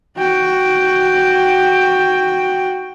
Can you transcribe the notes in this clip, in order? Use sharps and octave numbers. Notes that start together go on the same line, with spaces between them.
F#4 G5